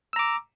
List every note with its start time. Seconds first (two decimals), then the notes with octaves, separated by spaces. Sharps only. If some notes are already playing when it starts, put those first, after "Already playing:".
0.13 E6
0.16 A#5
0.19 D6